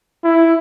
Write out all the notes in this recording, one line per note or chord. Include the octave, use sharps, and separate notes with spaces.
E4